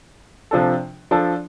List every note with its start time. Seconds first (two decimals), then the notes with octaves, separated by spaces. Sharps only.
0.51 C3 F3 D4 A4
1.11 F3 D4 A4